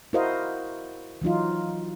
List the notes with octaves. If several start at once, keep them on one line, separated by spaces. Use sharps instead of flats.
E4 F#4 A#4 C5 D#5 F5
E3 F#3 D#4 F4